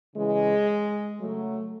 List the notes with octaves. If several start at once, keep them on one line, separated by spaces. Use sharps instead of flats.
C#3 E3 G#3
C#3 F#3 A3